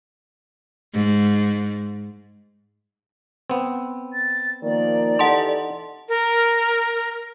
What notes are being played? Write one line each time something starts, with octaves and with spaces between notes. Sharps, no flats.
G#2
B3 C4
A6
D#3 F3 A#3 D5
E3 D#4 G4 A4 F#5 A5 C6
A#4